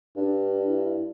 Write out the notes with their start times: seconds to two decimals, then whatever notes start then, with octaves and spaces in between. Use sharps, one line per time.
0.16 G2 D4
0.67 E4